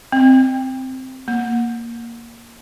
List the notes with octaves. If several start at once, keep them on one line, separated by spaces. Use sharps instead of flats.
C4
A#3